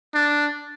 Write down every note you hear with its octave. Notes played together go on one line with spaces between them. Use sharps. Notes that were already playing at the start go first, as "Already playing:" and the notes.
D4